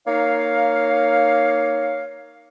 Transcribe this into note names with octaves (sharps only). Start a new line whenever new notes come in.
A#3 D#4 C#5 F5